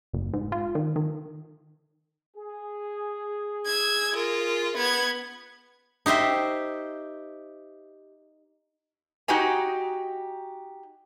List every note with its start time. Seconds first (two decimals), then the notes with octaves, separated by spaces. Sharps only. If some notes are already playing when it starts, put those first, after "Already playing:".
0.13 F#1
0.33 G#2
0.52 F4
0.75 D#3
0.96 D#3
2.37 G#4
3.66 E6 G#6
4.15 F4 A#4
4.76 B3 G#6
6.06 D#4 G4 C5 E5
9.28 D#4 F#4 G4 D#5 G#5